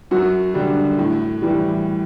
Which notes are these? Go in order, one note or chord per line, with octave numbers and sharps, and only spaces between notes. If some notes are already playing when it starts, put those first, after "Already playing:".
F#2 F#4
D3 G3
A2
E3 G3